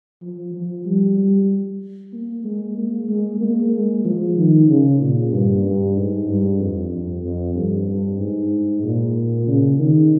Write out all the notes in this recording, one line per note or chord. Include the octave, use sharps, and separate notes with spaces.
F3
F3
G3
G3
A#3
G#3
A#3
G#3
A#3
G#3
F3
D#3
C#3
A#2
G2
G2
G#2
G2
F2
F2
F2
G2
G2
G#2
A#2
C#3
D#3